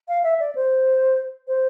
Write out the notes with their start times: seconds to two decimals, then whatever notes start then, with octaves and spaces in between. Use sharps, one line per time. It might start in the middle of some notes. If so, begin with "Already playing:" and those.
0.08 F5
0.24 E5
0.40 D5
0.55 C5
1.48 C5